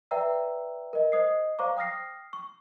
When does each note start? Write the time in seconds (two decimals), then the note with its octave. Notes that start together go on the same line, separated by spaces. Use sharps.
0.11 B4 D5 E5 G5 A#5 E6
0.93 A#4 D#5
1.12 C5 D#5 D#6 C7
1.59 C5 D5 F5 A#5 C#6 D6
1.77 G5 D#6 F6 A#6 C7
2.33 C#6